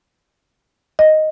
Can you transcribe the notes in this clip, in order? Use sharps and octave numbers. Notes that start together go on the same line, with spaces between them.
D#5